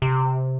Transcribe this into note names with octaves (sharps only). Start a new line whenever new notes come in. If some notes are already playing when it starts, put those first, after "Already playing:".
C3